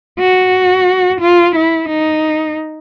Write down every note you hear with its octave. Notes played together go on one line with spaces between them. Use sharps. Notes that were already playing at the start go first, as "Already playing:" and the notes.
F#4
F4
E4
D#4